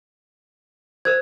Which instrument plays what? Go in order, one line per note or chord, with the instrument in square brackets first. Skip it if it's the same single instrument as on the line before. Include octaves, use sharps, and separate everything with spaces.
[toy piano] A#4 C5 [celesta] G#6